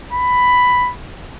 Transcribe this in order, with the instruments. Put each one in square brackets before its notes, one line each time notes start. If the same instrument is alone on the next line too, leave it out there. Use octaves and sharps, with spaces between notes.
[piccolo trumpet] B5